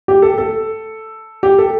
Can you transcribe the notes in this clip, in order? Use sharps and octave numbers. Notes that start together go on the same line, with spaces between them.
G4
A4
A4
G4
A4